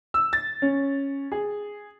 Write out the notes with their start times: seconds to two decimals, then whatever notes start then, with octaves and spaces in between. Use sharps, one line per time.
0.14 E6
0.33 A6
0.62 C#4
1.32 G#4